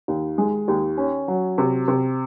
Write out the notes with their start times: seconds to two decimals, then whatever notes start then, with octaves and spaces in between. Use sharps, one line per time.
0.08 D#2
0.38 G#3
0.68 D#2
0.97 C#4
1.28 F#3
1.58 C3
1.88 C3